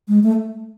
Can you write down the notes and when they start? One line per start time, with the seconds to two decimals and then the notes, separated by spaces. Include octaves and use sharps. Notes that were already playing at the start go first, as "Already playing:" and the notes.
0.08 G#3
0.23 A3